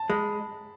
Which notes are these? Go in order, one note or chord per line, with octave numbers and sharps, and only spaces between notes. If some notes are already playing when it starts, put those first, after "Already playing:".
Already playing: A5
G#3 B5